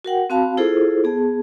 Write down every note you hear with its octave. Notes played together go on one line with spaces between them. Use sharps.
F#4 A#4 F#5 G5
C4 F#4 F5 A5 B5
E4 F4 G#4 A4 C5
B3 G#4 A5